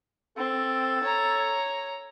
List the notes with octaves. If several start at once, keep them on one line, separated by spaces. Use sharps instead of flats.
C4 A4
C#5 A#5